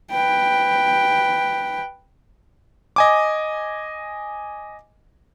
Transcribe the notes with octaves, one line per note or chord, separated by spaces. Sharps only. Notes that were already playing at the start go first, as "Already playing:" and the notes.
B4 G5
D#5 G#5 D6